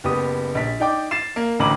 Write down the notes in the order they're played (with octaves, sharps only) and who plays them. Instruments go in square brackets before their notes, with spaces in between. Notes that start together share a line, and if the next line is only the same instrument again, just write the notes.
[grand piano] F#1 B3 G4 D#6
A#1 B6
D#4 D5 G5 D6
A6 C7 E7
A#3
A1 D2 A#5 B5 D6 F#7